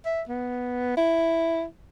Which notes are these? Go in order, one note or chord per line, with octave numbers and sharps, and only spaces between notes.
E5
B3
E4